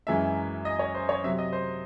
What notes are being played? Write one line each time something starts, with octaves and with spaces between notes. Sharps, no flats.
F#2 E3 G#3 C#4 E5
D#5
C#5
C5
C#5
C3 F#3 C4 E5
D#5
C5